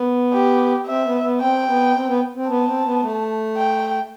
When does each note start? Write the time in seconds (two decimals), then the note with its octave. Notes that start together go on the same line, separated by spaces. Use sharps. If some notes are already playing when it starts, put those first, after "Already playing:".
Already playing: B3
0.33 G4
0.86 C4 E5
1.05 B3
1.22 B3
1.41 C4 G5
1.68 B3
1.95 C4
2.08 B3
2.36 C4
2.48 B3 A5
2.66 C4
2.85 B3
3.02 A3
3.57 G5